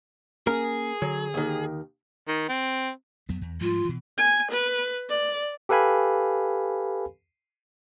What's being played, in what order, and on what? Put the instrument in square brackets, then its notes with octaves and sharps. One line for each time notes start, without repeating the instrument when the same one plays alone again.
[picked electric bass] A#3 C#4 [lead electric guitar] G#4 [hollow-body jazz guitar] A#4
[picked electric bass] D3 [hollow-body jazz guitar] F#3
[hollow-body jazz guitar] D#2 D#3
[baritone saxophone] D#3
C4
[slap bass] F2 F#3 B3
E2
[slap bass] G#2 F3 G3 [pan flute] F4
[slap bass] B2 E3
[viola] G#5
B4
D5
[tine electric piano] G4 A4 B4 F5 G#5 B5